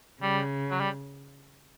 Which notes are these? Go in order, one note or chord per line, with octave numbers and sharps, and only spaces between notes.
C#3 G3
F#3
G3